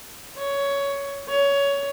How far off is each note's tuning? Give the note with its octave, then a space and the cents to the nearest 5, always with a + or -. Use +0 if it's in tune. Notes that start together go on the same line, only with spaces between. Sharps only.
C#5 +15
C#5 +20